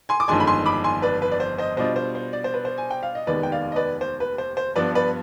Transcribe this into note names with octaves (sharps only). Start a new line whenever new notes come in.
G#5 C6
D6
G1 F2 D#3 G#3 D4 G#5 C6
B5
G#5 C6
B5 D6
G#5 C6
B4 D5
B4
D5
C5
C5 D#5
B2 G3 D4 F4 C5 D#5
C5
C5
D5
C5
B4
C5
G#5
G5
F5
D#5
F1 D#2 D#3 G#3 B3 B4 D5
G5
D5 F5
D#5
B4 D5
C5
B4
C5
C5
G2 F3 B3 D4 B4 D5
B4 D5